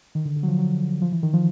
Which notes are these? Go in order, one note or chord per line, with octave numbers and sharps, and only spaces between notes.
D#3
D3
D3
F#3
F3
F#3
F3
E3
D#3
F3